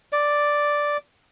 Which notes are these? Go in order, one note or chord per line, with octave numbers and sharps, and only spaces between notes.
D5